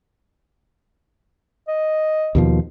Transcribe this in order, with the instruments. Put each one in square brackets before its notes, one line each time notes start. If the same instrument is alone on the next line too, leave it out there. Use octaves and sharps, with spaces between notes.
[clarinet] D#5
[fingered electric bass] D#2 B2 F3